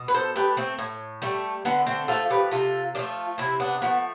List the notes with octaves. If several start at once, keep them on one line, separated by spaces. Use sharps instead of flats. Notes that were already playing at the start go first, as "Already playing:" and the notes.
Already playing: B2
B4
A4 C5
A3 G4 B4
A3 C4
A2
G3 A3
D3 B3
A3 C4
F3 A3 F4 A4
G4 B4
C3 F4 A4
F3 A3 D4 F4
C3 C4 E4
B3 D4
F3 A3 B3